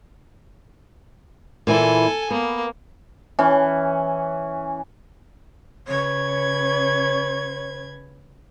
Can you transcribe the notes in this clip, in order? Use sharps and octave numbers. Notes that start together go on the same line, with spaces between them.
A#2 E3 E4 A4 G#5
A#3 B3
E3 C#4
C#3 B4 C#5 G#6